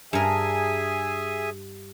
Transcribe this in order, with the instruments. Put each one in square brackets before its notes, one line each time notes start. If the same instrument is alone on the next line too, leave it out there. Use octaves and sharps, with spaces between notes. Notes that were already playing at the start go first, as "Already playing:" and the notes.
[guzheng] G2 A#4 [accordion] G#4 E5 G#5